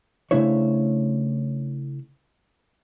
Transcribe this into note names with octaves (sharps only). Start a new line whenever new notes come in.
C#3 A3 D4 E4 C5 C#5